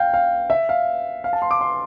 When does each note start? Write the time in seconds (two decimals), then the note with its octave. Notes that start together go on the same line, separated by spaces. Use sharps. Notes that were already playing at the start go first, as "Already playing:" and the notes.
Already playing: F5 G5
0.14 F5
0.50 E5
0.69 F5
1.24 F5
1.33 A5
1.42 C6
1.51 D6
1.61 C6